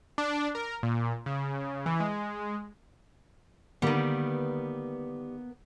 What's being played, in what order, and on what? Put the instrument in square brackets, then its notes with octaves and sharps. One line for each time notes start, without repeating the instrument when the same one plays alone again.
[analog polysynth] D4
A#4
A#2
C#3
E3
G#3
[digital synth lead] D3 [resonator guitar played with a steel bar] D#3 G3 [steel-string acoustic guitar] A#3 B3 B4